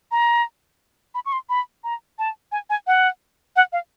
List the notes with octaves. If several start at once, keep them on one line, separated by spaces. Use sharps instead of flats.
A#5
B5
C#6
C6
B5
A#5
A5
G#5
G#5
F#5
F#5
F5